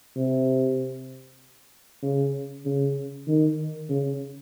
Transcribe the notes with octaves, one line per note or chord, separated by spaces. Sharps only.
C3
C#3
C#3
D#3
C#3